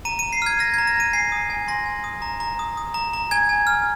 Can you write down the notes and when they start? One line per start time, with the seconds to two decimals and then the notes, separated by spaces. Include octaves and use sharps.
0.05 A#5 D#7
0.19 A#5 D#7
0.33 C7
0.42 F6 G#6
0.59 F6 A#6
0.74 A#5 G#6
0.87 A#6
0.96 A#5 D#7
1.13 G#5 C7
1.32 D#6
1.50 G#5
1.68 C6 A#6
1.86 G#5
2.04 D#6
2.22 A#5
2.40 A#5
2.59 D#6
2.77 D#6
2.94 A#5
3.13 A#5
3.31 G#5 G#6
3.49 G#5
3.67 F6